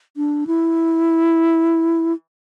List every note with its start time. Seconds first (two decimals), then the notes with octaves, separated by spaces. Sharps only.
0.17 D4
0.47 E4